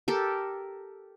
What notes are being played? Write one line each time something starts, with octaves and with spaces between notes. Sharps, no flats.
G4 A4 A#4